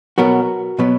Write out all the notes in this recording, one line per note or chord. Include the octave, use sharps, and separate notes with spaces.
B2 F#3 B3 F#4 A#4
B2 F#3 B3